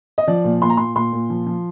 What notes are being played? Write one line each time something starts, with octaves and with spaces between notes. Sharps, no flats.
D#5
F3 D5
A#2
A#2 C6
A#5
A#2 C6
A#2 C6
A#2
F3
F3